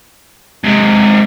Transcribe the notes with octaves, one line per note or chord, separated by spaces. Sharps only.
G#2 C3